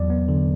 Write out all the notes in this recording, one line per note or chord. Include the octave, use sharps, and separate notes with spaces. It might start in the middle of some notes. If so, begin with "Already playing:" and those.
Already playing: E2 F#3 D5
B3
D3